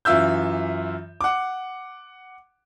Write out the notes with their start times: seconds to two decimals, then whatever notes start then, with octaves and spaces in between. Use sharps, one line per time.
0.05 F#2 E3 F4 E5 E6 G6
1.21 F#5 D6